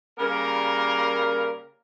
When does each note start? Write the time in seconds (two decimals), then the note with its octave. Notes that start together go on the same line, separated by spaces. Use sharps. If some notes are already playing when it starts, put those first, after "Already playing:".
0.19 C#3 G3 A#3 A#4